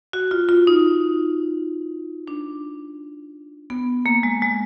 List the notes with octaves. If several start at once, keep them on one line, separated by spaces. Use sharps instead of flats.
F#4
F4
F4
D#4
D4
B3
A#3
G#3
G#3